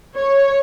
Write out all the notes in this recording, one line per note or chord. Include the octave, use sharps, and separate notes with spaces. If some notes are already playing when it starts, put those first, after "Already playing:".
C#5